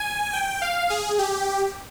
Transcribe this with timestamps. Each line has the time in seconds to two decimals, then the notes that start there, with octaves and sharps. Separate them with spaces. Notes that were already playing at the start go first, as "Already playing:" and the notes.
Already playing: G#5
0.33 G5
0.62 F5
0.90 G#4
1.19 G4